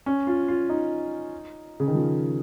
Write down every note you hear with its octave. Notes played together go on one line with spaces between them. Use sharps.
C#4
F4
F4
D#4
C#3
D#3
F3